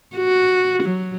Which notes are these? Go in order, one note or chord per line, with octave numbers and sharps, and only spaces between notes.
F#4
F#3